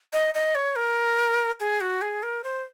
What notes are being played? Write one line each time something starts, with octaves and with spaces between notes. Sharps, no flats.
D#5
D#5
C#5
A#4
G#4
F#4
G#4
A#4
C5